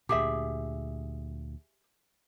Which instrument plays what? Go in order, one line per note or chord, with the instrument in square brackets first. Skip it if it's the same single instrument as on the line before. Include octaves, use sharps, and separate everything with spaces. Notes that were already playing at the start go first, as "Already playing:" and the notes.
[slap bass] D2 A#2 [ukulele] G4 G#4 E5